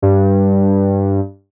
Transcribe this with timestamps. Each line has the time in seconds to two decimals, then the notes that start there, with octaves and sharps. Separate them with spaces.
0.02 G2